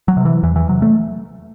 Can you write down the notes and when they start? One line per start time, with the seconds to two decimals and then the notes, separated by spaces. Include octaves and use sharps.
0.08 F#3
0.17 C3
0.25 E3
0.43 E2 E3
0.56 E3
0.69 C3 F#3
0.82 A3